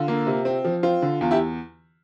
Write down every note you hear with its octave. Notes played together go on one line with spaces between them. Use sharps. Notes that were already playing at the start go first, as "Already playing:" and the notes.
Already playing: D3 F4
A#3
C3
C4
F3
C4 F4
D3
E2 F4
E4 G4